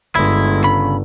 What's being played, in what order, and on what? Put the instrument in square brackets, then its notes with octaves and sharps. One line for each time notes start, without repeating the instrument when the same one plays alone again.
[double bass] G1 [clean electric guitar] G#3 E4
[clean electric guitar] C#3 B5